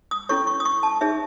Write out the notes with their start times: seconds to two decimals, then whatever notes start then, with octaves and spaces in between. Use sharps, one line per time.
0.11 D#6
0.29 C#4 E4 A4 C#5 C#6
0.47 C#6
0.60 D#6
0.65 C#6
0.83 A5
1.01 D#4 G#4 C#5 E5